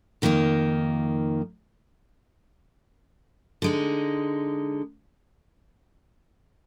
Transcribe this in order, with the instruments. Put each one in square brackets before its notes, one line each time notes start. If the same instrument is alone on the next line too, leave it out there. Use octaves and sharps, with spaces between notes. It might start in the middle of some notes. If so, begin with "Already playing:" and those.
[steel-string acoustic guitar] F2 D#3 A#3 D#4
D3 G#3 D#4